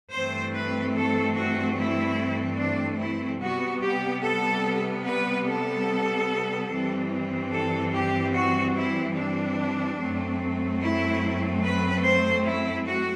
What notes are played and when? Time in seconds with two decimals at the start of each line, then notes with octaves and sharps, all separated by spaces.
0.12 G2 E3 A3 C4 C5
0.54 B4
0.94 A4
1.35 F#4
1.77 E4
2.59 D4
2.99 E4
3.41 C3 G3 B3 F#4
3.82 G4
4.23 A4
5.05 B4
5.46 A4
6.69 G2 E3 G3 C4
7.51 A4
7.92 G4
8.34 F#4
8.75 E4
9.16 D4
9.98 F#2 F#3 A3 C4
10.80 E4
11.62 B4
12.03 C5
12.45 E4
12.86 F#4